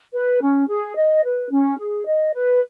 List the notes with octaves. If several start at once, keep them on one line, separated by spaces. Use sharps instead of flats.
B4
C#4
G#4
D#5
B4
C#4
G#4
D#5
B4